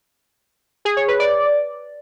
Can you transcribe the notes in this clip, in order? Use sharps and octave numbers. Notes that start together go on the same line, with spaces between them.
G#4
C#5
B4
D5